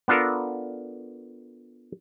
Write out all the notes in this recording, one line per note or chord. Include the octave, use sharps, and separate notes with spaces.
B3 D4 F4 A4 A#4